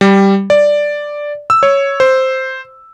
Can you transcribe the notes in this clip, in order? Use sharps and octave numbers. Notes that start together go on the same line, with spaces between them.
G3
D5
E6
C#5
C5